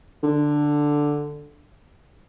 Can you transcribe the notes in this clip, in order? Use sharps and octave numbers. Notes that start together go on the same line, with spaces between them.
D3